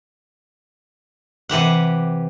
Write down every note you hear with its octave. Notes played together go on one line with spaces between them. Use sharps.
C3 E3 G4 F#5